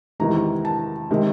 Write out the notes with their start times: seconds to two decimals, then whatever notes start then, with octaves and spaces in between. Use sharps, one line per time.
0.20 E2 C3 D#3 G#3 A#5
0.65 A5
1.11 C3 D#3 G#3